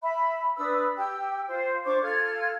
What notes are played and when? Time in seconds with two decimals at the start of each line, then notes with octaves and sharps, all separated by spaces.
0.01 E5 B5
0.56 D4 B4 D#6 E6
0.96 G4 G5 E6
1.48 F4 C5
1.84 D4 C5 C#6 D6
2.01 F4 A4 F6 G#6